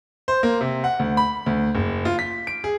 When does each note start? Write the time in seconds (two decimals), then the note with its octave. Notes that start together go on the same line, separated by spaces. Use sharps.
0.28 C5
0.43 A#3
0.61 C3
0.84 F#5
0.99 D2
1.17 B5
1.46 D2
1.75 F#1
2.05 F4
2.19 B6
2.47 D7
2.64 G#4